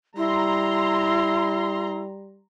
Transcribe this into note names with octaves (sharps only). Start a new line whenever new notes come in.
G3 E4 A#5 C6